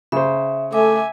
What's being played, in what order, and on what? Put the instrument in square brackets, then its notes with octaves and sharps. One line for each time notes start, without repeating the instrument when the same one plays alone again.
[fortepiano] C#3 C5 [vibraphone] E5
[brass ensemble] A3 [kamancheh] E5 G#5 [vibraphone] D6